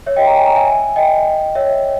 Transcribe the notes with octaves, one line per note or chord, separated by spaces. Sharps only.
C#5 E5
D#5 G5
G5 A#5
G#5
A#5
E5 G#5
D#5 G5
C#5 E5